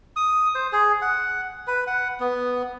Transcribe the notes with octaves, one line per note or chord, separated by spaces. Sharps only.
D#6
C5
G#4
F#5
B4
F#5
B3